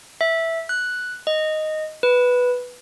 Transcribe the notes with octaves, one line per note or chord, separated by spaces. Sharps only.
E5
F#6
D#5
B4